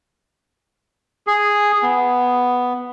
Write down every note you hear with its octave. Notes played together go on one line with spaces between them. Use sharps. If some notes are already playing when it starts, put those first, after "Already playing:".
G#4
B3